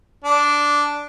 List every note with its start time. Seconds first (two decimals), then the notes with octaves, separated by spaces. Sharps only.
0.24 D4